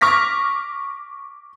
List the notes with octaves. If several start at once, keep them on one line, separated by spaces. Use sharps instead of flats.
C#6 D6 F6 A#6 B6